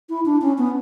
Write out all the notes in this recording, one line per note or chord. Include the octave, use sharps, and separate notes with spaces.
E4
D4
C#4
B3